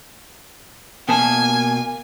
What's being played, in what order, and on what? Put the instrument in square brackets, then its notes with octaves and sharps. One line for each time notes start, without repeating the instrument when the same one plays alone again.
[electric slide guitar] B2 A#3 A5 [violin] G#5